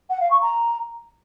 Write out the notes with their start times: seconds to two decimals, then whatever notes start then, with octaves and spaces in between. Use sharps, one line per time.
0.09 F#5
0.20 F5
0.30 C#6
0.41 A#5